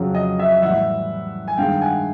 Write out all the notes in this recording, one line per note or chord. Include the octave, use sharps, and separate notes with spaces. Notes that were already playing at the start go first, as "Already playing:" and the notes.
Already playing: F2 C#3 F#3
D#5
E5
A2 E3 G3 E5 F#5
G#5
G2 D#3 G#3 F5 G5
F#5 G#5